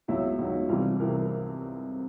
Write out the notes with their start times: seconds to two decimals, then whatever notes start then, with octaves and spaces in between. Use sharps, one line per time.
0.08 C#2 B2 F#3 E4
0.39 C#2 B2 F#3 D#4
0.69 C2 C3 E3 G3 F4
0.99 C2 C3 E3 G3 A#4
1.15 A#4